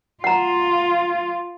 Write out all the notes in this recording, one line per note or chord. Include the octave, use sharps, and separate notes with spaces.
F4 F#5 A#5